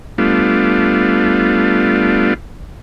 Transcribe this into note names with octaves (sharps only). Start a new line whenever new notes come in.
G3 A3 B3 D4 F4